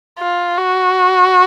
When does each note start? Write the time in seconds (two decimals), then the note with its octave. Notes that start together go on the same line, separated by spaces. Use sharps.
0.19 F4
0.58 F#4